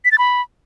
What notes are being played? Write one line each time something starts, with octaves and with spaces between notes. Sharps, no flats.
B6
A6
B5